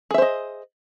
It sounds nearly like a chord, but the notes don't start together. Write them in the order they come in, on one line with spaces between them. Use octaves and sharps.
G#4 E5 C5 D#5